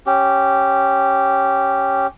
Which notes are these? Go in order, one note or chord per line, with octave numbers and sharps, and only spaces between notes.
C#4 G4